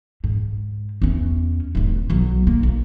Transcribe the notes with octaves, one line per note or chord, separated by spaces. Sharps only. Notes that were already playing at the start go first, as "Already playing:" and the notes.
G#2
E2 C#4
D1 G2
B1 F#3
A#3
A#1